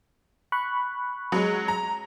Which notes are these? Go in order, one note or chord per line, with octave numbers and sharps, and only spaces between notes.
B5 C#6 F#6
F#3 G#3
A#5